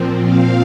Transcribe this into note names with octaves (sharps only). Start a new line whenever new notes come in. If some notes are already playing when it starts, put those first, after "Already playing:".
Already playing: A#2 F3 C4
F5